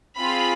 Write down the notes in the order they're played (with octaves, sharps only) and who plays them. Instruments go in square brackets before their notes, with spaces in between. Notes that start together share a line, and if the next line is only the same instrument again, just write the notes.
[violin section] C4 F4 G#4 B5